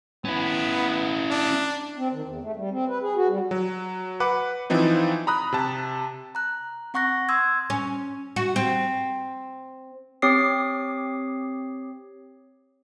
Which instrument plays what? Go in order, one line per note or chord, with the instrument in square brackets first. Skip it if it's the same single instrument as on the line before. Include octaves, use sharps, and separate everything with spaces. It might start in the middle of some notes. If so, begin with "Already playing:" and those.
[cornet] B3 [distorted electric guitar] C#4 E4
[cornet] D4
[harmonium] C4
D#3
E2
A3
G3
C4
B4
G#4
F#4
G3
[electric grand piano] F#3
B4 F#5 D6
E3 F3 C4 D#4
A#5 B5 D#6 F#6
C3 A5
[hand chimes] A#5 F#6
C4 F#5 C#6 F#6 A#6
C6 D#6 E6 G#6
[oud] C#4
F#4
C4
[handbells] C4 G4 C#5 D6 D#6 C7